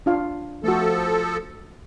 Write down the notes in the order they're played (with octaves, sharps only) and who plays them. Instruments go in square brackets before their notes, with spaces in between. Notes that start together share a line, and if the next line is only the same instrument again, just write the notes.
[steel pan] D4 F4 F5
[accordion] F3 A4 [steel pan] A3 F#4